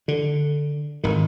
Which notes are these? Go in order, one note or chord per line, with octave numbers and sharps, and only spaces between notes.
D3
G#1 D#3